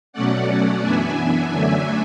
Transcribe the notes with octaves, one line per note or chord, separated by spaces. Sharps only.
B2 F#3 A3 C#4 D5 F#5
D5 F#5
F#2 E3 B3 D4 E5 G#5
F#2 D3 F#3 A3 D4 E5 G#5